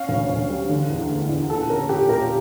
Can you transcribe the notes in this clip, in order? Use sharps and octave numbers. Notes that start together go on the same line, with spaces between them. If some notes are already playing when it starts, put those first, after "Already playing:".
Already playing: C#4 F5
D2
D2
G3
D3
E2
A3
E2
A#2 A4
C#4 A#4
A#2 G4
A#2 A#4